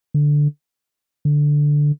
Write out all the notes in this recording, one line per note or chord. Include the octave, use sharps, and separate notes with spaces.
D3
D3